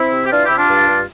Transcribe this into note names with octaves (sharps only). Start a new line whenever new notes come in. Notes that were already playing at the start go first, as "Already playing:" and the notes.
Already playing: C4 E4
C3
G4
E3 D4 F4
E4 G4
C3
D4 F4
G2
G2